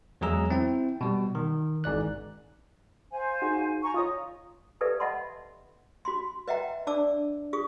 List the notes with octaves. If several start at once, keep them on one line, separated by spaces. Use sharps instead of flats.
E2 F#3 G#3 G#4 A#5 E6
C4 E4 G5
B2 G3
D#3
G#1 G#2 D5 F#6
C5 F5 G#5
D#4 F#4 G#4
G#5 A#5 C#6
F4 C#5 D#5 D#6
G4 A4 B4 D5 E5 F5
D#5 E5 F#5 A5 B5 C6
F#4 B5 C6
B4 D#5 E5 F#5 G5 A#5
D4 D5 A5 D6 E6
F4 G#4 C#6 D#6